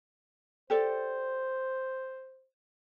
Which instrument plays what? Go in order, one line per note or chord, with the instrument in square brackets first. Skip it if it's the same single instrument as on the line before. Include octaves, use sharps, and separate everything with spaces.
[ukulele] G4 A4 D5 [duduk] C5